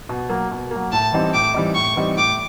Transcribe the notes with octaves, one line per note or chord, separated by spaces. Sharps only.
B2
F#3 A#3
B2
F#3 A#3
A2 A5
E3 G3 C4 D#4
A2 D6
E3 G3 C4 D#4
A2 C#6
E3 G3 C4 D#4
A2 D6